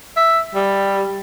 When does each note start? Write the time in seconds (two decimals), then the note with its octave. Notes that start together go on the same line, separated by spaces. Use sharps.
0.17 E5
0.55 G3